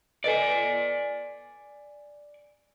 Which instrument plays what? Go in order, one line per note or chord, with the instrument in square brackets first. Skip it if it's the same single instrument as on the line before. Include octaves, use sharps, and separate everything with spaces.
[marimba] A4 B4 D#5 [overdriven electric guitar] D5 G#5